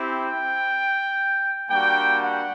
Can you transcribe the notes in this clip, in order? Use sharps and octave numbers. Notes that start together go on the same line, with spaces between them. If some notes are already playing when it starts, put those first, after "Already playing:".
Already playing: C4 E4 G4
G5
G3 A#3 D4 F#4 G5
F#5